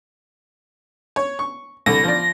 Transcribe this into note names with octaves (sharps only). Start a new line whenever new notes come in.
C#5
C#6
C2 D3 A#6
F3 D5